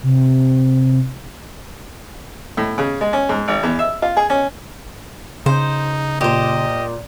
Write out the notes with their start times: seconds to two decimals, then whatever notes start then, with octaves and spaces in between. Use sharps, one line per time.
0.03 C3
2.57 A2
2.78 C#3
3.01 G#3
3.13 C#4
3.29 G#2
3.48 G#1
3.63 E2
3.79 E5
4.02 F4
4.17 G#4
4.30 C#4
5.46 C#3 D#4 C5
6.21 A#2 G4 C5 D#5